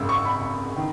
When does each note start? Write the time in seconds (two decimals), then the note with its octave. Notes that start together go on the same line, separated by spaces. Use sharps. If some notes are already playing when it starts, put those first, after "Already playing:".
Already playing: G#1 F#2 C#3 G#3 E6
0.09 C#6
0.25 B5
0.76 D#3